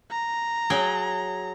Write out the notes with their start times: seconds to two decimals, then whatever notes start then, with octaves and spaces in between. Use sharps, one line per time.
0.11 A#5
0.70 F#3 G#4 G5